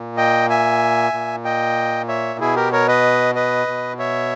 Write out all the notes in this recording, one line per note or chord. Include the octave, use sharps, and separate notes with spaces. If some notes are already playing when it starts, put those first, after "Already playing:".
Already playing: A#2
D#5 G5
E5 G#5
A#2
D#5 G5
C#5 E5
B2 E4 G#4
G4 A#4
A#4 C#5
B4 D#5
B4 D#5
B2
C#5 E5